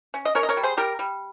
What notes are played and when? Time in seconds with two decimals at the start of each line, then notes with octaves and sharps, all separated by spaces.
0.14 C#4
0.25 D#5
0.35 C#4 A#4 C#5
0.43 D#5
0.49 A#4 C#5
0.57 G3
0.63 G#4 C5
0.77 G3 G4 A#4
0.99 G3